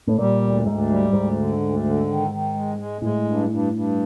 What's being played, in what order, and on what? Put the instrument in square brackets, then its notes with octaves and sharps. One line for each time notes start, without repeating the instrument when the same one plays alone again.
[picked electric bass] A2
[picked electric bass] A#2 [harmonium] G3
[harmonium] D2
[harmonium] D2 [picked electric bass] G#2
[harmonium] G3
[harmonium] D2 [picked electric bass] G#2
[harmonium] D3
D2
D3
D#3
D#3
G#3
G#3
[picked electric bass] A2 [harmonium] G#3
[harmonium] G2
G2
G2